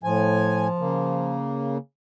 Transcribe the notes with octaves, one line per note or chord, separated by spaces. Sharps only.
A2 F3 G#5
C#3 A#3